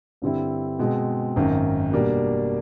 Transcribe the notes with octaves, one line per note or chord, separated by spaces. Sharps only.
G2 D3 G3 C4 E4
B2 G#3 C4
G#1 F#2 D#3
B2 G3 A#3 D4